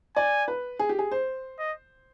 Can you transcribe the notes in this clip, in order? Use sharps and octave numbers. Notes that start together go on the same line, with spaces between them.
D5 G#5
B4
G#4
G4
G#4
C5
D#5